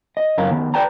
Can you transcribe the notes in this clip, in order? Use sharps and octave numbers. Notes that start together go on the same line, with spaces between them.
D#5
C#2 F#2 C#4 A#4 F5
D#3 B3
B4 D5 G5 A5 A#5